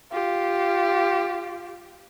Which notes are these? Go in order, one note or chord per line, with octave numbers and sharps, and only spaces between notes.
F4 G4